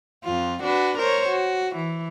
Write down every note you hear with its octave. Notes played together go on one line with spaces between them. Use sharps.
F2 F4
D4 F#4 B4
A#4 C5 C#5
F#4
E3